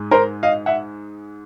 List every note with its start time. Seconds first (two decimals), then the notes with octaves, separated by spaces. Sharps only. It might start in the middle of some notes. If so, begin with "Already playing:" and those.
Already playing: G#2 G#3
0.11 A#4 C5
0.43 D#5 F5
0.66 E5 F#5